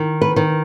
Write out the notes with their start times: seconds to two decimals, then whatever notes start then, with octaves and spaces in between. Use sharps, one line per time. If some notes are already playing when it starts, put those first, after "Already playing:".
Already playing: D#3
0.21 B4
0.36 D#3